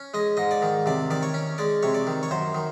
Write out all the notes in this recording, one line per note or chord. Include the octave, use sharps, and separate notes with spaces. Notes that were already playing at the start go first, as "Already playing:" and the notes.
Already playing: C#4
G#3 D#5
G#2 D#5
D5
D#3
C3 D5
D#3 D5
C#5
C#4
G#3 D5
C3 C#5
D5
D#3
C#5
F#2 C5
D#3